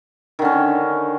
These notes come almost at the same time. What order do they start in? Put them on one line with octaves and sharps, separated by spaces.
D#3 D3 C#4